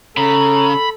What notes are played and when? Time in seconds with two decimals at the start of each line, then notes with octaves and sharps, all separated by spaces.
0.17 C#3 A4 A#5 B5